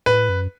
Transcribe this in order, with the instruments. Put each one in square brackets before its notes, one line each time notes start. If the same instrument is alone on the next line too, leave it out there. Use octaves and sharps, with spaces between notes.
[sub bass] A2 [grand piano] B4
[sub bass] F#2